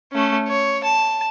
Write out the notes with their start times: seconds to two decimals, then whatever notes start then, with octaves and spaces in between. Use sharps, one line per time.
0.12 A3 C#4
0.48 C#5
0.83 A5